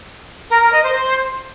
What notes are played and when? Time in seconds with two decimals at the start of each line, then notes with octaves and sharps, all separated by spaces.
0.49 A#4
0.61 A#4
0.72 D#5
0.83 C5